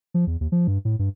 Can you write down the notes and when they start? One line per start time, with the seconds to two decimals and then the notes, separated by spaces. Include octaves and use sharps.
0.14 F3
0.27 E2
0.41 D#2
0.52 F3
0.67 G2
0.85 A2
0.99 G2